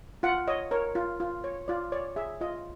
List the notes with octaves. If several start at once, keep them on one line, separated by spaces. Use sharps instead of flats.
F4 F#5
C#5 D#5
A#4 C#5
F4
F4
C#5
F4 D5
C#5 D5
G#4 E5
F4 D#5